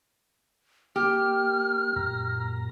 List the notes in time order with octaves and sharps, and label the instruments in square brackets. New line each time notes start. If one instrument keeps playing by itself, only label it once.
[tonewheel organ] A#3 [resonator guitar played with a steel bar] G4 [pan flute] F6
[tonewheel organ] F#2 A#2 A#5